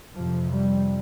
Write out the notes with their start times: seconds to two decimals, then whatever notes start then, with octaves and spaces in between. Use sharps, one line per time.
0.13 F2 C3 F3
0.51 G3